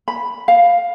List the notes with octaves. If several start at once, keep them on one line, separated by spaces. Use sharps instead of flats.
B5
F5